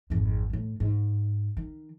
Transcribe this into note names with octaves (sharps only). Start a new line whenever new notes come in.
G#1 F2
A2 D#3
G#2
D#3